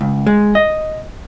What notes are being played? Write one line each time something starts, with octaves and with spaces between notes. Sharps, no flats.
C#2
G#3
D#5